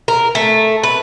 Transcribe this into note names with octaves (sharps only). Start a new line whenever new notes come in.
A#4
A3
B4